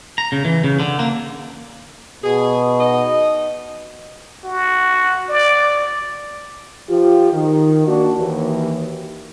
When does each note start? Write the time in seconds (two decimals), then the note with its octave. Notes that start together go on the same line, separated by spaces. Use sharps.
0.18 A#5
0.32 C#3
0.45 E3
0.64 C#3
0.80 D3
0.99 A#3
2.24 B2 G#4
2.80 D#4 D#5
4.44 F#4
5.29 D5
6.88 F3 F4 G4
7.33 D#3
7.86 A#3 D4 F#4
8.18 D#2 E3